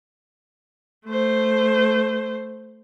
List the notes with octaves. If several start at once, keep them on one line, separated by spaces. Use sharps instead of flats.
A3 C5